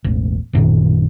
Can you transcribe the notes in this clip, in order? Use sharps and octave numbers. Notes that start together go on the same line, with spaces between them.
E1 A1
A1 F#2 A#2 D#3